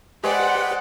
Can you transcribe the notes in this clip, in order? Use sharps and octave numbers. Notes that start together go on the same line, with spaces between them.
G#3 G4 B4 C5 D5 F#5 G5